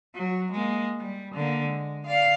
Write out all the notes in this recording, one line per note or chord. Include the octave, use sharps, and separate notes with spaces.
F#3
G#3 A#3
G3
D3 A#3
G#3
D5 F5